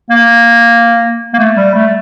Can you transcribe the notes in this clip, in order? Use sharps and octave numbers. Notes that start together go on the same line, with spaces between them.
A#3
A#3
A3
G3
A3